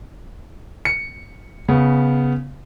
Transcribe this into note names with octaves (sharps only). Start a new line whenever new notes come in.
C#7
C#3 B3